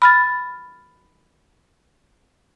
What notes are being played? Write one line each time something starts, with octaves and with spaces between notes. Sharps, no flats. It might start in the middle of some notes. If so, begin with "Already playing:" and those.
B5 F6 A6